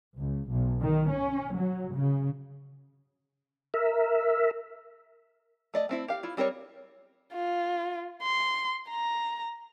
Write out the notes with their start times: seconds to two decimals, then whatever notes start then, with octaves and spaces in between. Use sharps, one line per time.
0.17 C#2
0.49 B1
0.81 D#3
1.11 C#4
1.55 F#3
1.94 C#3
3.74 A#4 E5
5.74 A3 D5 D#5
5.89 A3 C4 E4
6.08 G4 F5
6.23 E4 F4
6.37 G3 C4 A#4 C5 C#5
7.33 F4
8.23 C6
8.90 A#5